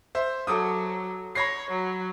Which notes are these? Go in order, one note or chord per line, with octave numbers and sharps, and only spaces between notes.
C5 E5 C6
F#3 A4 D6 D#6
C#5 B5 A#6 C7
F#3